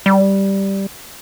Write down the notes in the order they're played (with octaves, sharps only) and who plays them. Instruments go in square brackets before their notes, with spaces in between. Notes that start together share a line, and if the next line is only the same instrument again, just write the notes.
[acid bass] G3